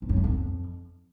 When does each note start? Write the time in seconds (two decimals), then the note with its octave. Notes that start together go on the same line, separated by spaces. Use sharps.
0.02 E2
0.09 F#2
0.17 A#2
0.24 F2